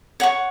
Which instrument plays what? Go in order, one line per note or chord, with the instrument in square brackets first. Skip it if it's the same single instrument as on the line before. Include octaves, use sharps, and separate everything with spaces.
[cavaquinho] C#5 F#5 C#6